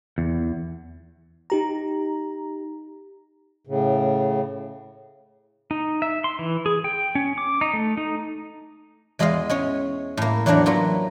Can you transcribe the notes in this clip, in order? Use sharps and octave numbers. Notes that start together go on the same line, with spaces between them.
E2
D#4 G4 A#5
A2 C#3
D#4
E5
C6
E3
G#4
G5
C#4
D6
D#4
A3
D#4
E2 G#3 F4 D#5 F5
G#3 C#4 C#5
A2 A#3
E2 F#3 A#3 D4 F5 F#5
F#3 A#3 F4 A#4 B4